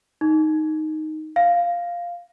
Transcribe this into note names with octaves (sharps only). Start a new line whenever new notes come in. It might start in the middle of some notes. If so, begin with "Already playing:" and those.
D#4
F5